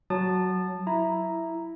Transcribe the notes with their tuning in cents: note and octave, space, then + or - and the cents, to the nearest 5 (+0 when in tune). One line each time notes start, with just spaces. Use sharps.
F#3 +0 A5 +0 D#6 -35
E4 +0 A#5 +0